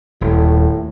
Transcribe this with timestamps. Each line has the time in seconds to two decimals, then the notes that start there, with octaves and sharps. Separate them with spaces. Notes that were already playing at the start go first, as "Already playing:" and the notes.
0.21 D#1 D#2 A2